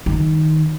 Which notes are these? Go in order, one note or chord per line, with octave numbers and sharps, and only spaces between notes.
D#3